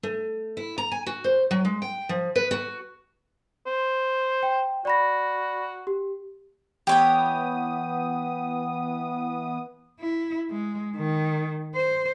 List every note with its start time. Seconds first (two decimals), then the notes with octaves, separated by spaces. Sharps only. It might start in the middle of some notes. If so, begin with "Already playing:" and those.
0.03 A3
0.57 E4
0.78 A#5
0.92 G#5
1.06 F#4
1.24 C5
1.51 F#3
1.65 G#3
1.82 G5
2.09 F3
2.36 B4
2.51 F#4
3.67 C5
4.43 G5
4.85 F#4 D5 B5 A#6
5.87 G4
6.87 E3 B3 G4 C#5 G5 D#6
10.00 E4
10.50 G#3
10.97 D#3
11.75 C5